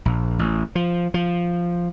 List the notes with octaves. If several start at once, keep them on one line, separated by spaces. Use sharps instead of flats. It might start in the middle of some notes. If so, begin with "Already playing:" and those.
A#1
A1
F3
F3